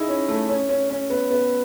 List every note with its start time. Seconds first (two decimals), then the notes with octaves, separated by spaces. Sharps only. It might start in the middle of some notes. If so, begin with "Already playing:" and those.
Already playing: D#4 E4 G#4
0.08 C#4
0.28 A3
0.49 C#4
0.69 C#4
0.89 C#4
1.10 B3
1.30 B3